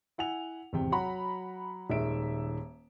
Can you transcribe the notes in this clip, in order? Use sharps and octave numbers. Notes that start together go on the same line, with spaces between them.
E4 F#5 G#5 F7
G#1 E2 C3 G5
F#3 F#5 A#5 B5
D#1 D#3 G#3 E5 D7